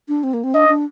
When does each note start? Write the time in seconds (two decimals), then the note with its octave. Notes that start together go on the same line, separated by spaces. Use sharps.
0.08 D4
0.23 C4
0.34 A#3
0.44 C4
0.54 D4 D#5
0.69 D4